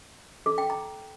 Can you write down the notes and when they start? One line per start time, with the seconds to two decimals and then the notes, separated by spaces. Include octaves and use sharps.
0.46 A4
0.58 G5
0.70 A#5